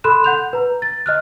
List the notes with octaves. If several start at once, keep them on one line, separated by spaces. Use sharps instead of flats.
A4 B5 C6 F#6 E7
F#5 G6 F7
B4 A#5
A6
D#5 F6 F#6